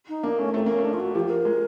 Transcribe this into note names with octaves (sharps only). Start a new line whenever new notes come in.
D#4
A#3 D4
A3 C#4
A3 C4
A#3 C#4
A3
D4
F4
F#4
F3 G4
A#4
G#3